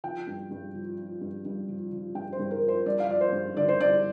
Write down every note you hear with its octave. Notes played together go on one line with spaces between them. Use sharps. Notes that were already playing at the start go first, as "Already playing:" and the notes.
F3 G5
G2
G2
F3
F3
G2
G2
F3
F3
G2 G5
C5
G2
A#4
F3
C5
G2 D5
F5
F3 D5
C5
G2
D3 D5
C5
G2 D5